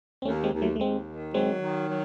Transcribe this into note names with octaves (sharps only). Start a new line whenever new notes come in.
C4
D#2 A3 C#4
G#3 C4
D#2
F#3 A3
A3
D#2 G#3 C4
D#3
F#3 G#3 C4
D#3
F#3